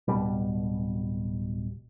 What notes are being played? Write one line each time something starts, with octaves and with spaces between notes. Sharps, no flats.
D1 B2 G3